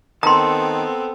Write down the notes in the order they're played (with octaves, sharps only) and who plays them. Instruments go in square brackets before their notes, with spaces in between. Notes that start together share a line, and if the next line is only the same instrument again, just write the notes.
[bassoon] D#3 [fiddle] B3 C4 [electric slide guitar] A4 A5 [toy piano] A#5 C6